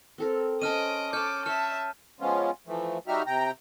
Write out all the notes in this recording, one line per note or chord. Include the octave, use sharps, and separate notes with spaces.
C4 A4 A#4
C#4 C5 D#5 A5 D6 F6 D7 D#7
A4 C#5 A5 D6 F6 G6
C#5 D#5 E5 A5 F6
F3 G#3 B3 C#4 F4
E3 F3 A3
G3 D#4 F#4 G4 E5 F6
C3 G5 A#5